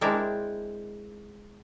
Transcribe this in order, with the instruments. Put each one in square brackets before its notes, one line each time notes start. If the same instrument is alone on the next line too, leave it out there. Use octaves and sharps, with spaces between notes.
[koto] G#3 C4 D4 E4 A#4